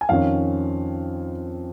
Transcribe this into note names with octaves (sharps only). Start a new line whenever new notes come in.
G#5
F2 D#3 C#4 F5